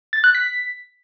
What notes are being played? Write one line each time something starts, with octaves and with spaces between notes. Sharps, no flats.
A6
F#6
B6